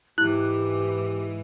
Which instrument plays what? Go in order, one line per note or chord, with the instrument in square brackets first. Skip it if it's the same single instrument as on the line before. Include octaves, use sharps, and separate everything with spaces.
[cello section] G#2 E3 [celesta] E4 [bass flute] G4 [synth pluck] F#6